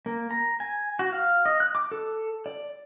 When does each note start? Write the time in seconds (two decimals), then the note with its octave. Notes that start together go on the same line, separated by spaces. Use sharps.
0.06 A#3
0.31 A#5
0.60 G#5
0.99 F#4
1.13 F5
1.46 D#5
1.60 F#6
1.75 D6
1.92 A4
2.46 D5